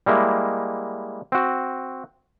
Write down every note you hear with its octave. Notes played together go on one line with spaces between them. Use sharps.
G3 G#3 A#3 E4
C4 F#4